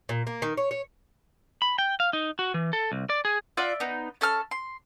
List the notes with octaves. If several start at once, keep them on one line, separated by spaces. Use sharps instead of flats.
A#2
A#3
D#3
C#5
C#5
B5
G5
F5
D#4
F#4
E3
A4
C2
D5
G#4
F4 D5 E5 F#5
B3 D#4
C#4 A4 A5 F6
C6